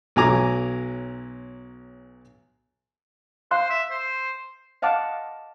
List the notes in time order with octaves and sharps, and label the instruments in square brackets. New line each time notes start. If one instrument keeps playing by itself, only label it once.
[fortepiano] B1 F#3 G#5 A#5 D6
[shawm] C5 [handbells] F5 C6 F#6
[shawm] E5
C5
[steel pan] D#5 F5 F#5 A5 D6